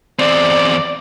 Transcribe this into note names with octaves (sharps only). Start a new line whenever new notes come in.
E2 C4 D5